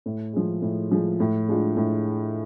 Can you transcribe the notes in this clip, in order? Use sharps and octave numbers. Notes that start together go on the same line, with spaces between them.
A2
F3 G#3
A2
F3 G#3
A2
G#3 D4 F4
A2